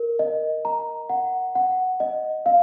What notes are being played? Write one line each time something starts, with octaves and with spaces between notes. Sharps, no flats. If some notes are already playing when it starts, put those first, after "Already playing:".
Already playing: A#4
D#5
A#5
F#5
F#5
D#5
F5